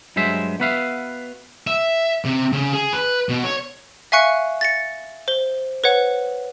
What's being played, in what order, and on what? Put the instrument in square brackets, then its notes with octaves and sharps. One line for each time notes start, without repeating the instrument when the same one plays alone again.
[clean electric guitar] G2 F#3 G#3 C5 E5
B3 F#4 B4 E5 F5
[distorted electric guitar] E5
C3
C#3
G#4
B4
B2
C#5
[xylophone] E5 F5 G#5 C#6 F#6 C#7
A6 A#6 C#7
C5 G7
B4 C#5 F#5